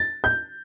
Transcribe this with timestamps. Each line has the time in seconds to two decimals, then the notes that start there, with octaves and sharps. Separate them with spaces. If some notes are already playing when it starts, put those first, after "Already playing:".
Already playing: A6
0.24 G6